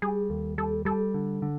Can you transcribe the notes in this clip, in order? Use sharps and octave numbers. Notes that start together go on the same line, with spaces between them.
G3 G#4
D#2 A4
G3 A4
G3 A4
D3
D3